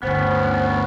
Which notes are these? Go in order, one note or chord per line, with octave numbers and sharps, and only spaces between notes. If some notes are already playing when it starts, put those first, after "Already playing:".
G1 D2 B3 C#4 C5